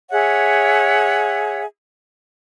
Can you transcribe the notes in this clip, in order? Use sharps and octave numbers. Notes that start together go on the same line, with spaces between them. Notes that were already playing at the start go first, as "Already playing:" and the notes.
G#4 C#5 E5 F#5